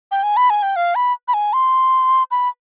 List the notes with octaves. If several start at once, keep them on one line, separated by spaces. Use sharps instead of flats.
G5
G#5
B5
G#5
G5
F5
B5
B5
G#5
C6
B5